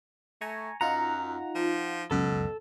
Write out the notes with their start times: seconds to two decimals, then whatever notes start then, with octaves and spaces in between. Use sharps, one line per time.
0.41 A3 G#5 A#5 C#6
0.81 F#2 D#4 F4 F#5 A#5
1.55 F3
2.11 C#2 F#2 B2 A4